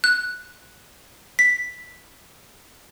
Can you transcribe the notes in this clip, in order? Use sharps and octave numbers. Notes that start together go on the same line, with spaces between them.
F#6
B6